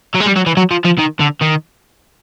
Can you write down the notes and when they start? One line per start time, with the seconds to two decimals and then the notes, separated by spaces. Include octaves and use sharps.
0.14 F#3
0.20 G#3
0.26 G3
0.36 F#3
0.46 E3
0.57 F#3
0.71 F3
0.85 F3
0.99 D#3
1.21 D3
1.42 D#3